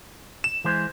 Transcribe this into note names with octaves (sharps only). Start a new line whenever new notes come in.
E7
E3 G#3 C5